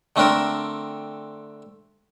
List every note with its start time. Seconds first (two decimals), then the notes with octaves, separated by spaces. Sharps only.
0.16 D3 A3 C4 D4 A#4